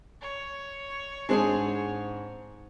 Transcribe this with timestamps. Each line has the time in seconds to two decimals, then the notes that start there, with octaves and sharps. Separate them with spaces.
0.21 C#5
1.29 G#2 G#3 C4 D4 G#4 G#5